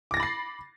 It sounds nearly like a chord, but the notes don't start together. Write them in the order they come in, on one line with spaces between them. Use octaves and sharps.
D6 A#6 A6 B5 C7